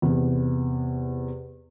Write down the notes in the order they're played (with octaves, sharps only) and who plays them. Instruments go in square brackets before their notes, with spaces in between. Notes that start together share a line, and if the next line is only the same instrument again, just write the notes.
[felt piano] E2 C3